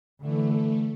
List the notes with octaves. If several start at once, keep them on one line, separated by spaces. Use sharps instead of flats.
D3 E3 A3